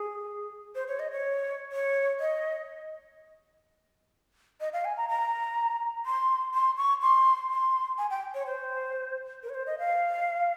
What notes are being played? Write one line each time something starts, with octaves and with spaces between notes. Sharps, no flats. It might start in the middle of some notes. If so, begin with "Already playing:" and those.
Already playing: G#4
C5
C#5
D#5
C#5
C#5
D#5
D#5
F5
G#5
A#5
A#5
C6
C6
C#6
C6
C6
G#5
G5
C#5
C5
A#4
C#5
C5
D#5
F5